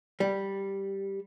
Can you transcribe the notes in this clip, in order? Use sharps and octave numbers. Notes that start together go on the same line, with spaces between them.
G3